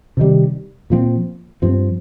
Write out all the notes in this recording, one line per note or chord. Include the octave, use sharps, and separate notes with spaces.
C3 D#3 G3
A#2 F3 C4
G2 F3 C4